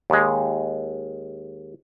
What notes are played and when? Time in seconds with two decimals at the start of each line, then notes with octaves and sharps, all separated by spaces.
0.10 D#2 G#3